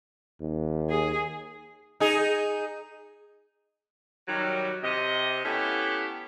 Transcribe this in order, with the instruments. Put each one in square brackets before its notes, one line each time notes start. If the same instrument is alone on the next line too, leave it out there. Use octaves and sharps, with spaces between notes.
[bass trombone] D#2
[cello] G#4
[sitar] D#4 G#4
[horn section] D#3 F#3 G3
C3 D#5
A3 B3 C#4 E4 G4